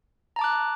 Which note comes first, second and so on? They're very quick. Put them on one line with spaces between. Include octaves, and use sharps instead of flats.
A#5 A5 D6 F#6